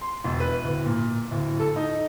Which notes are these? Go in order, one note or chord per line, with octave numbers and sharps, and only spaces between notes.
C6
E1
B4
D1
A#2
D1
A4
D#4